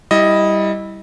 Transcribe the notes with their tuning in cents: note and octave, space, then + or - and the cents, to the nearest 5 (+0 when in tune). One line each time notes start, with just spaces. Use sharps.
G3 +0 E4 -15 D#5 +5